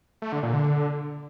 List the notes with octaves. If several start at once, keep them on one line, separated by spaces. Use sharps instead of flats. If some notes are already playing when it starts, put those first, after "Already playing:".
A3
D3
A#2
D3